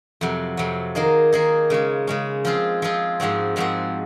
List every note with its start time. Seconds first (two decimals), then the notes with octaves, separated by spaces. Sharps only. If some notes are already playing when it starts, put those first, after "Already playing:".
0.21 F2 C3 F#3
0.57 F2 C3 F#3
0.95 D#3 A#3 D#4 G#4
1.32 D#3 A#3 D#4 G#4
1.70 C#3 G#3 C#4
2.07 C#3 G#3 C#4
2.45 F3 C4 F4 G#4
2.82 F3 C4 F4 G#4
3.20 G#2 F3 G#3 C4 F#4
3.56 G#2 F3 G#3 C4 F#4